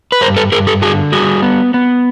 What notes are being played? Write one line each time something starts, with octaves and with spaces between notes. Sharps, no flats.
B4
G2 A#4 C5
A4 B4
G2 G#4 A#4
G4 A4
D3 F#4 G#4
G3 F#4 G#4
B3
B3